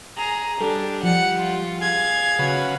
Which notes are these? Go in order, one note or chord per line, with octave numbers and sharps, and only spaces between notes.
G#4 A#5
G3 D4 A4
F3 F#5 C#7
F4
G#4 F5 G#6
C#3 C#4 F#4 B4